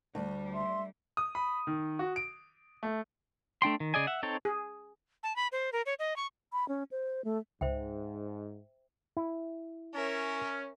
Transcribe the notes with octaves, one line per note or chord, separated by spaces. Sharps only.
D2 G3
E5 C6
D#6
B5
D#3
F#4
D7
A3
A3 D4 G5 C6
D#3
C#3 G#4 D5 D#5 G#5
E5 F#5
C4 D#4 A4 C#5 G5
G#4
A5
B5
C5
A#4
C#5
D#5
C#6
B5
C#4
C5
A3
C#2 G#2 C5 E5 G5
E4
C#4 A#4 E5